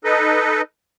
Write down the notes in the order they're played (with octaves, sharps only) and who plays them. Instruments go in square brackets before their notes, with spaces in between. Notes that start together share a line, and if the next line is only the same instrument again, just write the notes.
[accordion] D#4 A4 B4 D#5